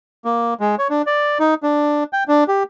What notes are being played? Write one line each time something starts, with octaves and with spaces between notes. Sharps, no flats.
A#3
G#3
C#5
D4
D5
D#4
D4
G5
D4
G4